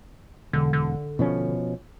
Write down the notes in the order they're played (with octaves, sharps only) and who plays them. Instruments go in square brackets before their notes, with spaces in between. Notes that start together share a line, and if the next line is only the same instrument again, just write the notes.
[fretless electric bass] E1 [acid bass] D3
[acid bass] D3
[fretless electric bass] B2 F3 C#4